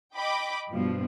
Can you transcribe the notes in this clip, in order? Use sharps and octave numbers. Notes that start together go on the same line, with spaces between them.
D#5 G5 B5 D6
G2 B2 F3